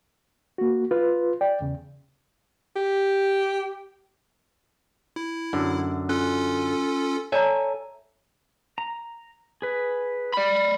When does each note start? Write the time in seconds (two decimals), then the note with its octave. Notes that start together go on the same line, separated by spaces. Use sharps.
0.58 A#3 F#4
0.91 F4 B4
1.41 D5 G5
1.61 E2 C#3
2.76 G4
5.16 E4
5.53 F#2 D3
6.09 C#4 F4 A4 F#6
7.32 A4 C#5 D5 E5 G#5 A#5
8.78 A#5
9.62 G#4 B4
10.34 D5 B5